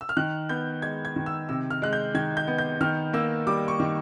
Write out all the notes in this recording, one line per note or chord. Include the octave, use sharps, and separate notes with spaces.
E6
F6
D#3 F#6
B3 G6
G#3 G#6
G#6
D#3
E6
C3 E6
F6
G#3 F#6
G6
D#3 G#6
G6
B3
G6
D#3 F6
A#3 E6
G3 D6
C#6
D#3